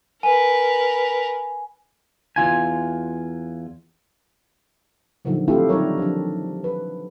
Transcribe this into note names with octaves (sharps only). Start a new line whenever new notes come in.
A#4 B4 G#5
E2 D#3 F4 G#5
A#2 D3 D#3 F3 F#3
A3 C4 D4 E4 F4 G4
D#3 F#3 G3 A#4 C#5
F3 F#3 D4
B4